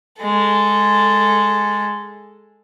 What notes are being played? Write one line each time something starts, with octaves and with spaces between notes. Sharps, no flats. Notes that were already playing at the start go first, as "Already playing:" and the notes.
G#3 A4